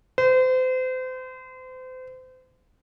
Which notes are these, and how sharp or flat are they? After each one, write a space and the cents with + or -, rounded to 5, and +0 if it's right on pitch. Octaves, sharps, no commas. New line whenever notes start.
C5 -35